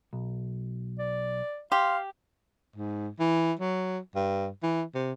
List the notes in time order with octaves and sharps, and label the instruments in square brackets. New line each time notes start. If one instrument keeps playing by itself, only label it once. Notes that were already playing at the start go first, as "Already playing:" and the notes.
[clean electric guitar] B1
[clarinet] D5
[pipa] G4 [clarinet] F5 [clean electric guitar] C6
[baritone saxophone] G#2
E3
F#3
G2
E3
C3